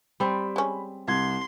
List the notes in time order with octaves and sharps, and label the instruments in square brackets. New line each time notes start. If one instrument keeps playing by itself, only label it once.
[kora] G3 C4 [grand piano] B5
[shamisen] G#3 C#4
[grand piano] C2 G#6 [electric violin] C6